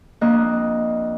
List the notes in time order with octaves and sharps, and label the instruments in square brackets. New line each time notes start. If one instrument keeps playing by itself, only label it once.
[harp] F2 A#3 D4 D#5 F#6